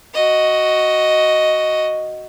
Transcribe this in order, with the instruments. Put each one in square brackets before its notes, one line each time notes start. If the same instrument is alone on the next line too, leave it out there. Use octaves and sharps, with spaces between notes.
[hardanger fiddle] F#4 D#5